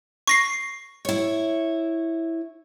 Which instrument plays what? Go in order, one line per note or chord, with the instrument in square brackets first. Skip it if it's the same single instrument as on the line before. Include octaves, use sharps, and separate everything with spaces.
[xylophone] C#6 A#6 C7
[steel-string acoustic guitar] E4 C#5